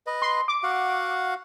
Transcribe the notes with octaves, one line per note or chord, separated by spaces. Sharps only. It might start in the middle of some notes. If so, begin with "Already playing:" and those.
B4 D#5
C6
D6
F#4 F5 F#5